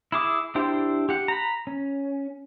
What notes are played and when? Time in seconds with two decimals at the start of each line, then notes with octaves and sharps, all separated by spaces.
0.12 E4 G#4 D6
0.55 D4 E4 G4 C5 G5
1.09 G4 F#5
1.28 A#5 B5
1.67 C#4